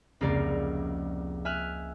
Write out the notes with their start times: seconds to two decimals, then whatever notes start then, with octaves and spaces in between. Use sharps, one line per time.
0.21 F1 C#2 A#3 A#4 D5
1.45 E5 G#5 F6 F#6